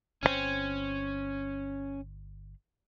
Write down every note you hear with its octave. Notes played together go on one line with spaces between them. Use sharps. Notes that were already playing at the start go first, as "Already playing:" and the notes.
G1 C#3 C4 C#4